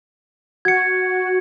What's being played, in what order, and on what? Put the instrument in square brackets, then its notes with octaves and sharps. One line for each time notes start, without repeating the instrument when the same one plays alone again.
[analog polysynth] F#4 [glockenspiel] G#6 C#7